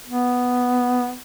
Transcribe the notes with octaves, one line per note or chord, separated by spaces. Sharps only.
B3